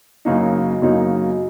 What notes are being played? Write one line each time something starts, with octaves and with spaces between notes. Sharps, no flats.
F#2 C#3 F#3 A#3 D#4
F#2 C#3 F#3 A#3 D#4